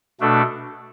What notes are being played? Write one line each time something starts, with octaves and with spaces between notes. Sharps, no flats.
B2 A3 D4 A4